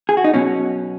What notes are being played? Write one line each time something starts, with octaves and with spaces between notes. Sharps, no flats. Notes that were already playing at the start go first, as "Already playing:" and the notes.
G#4
F#4
D#4
B2 F#3 C#4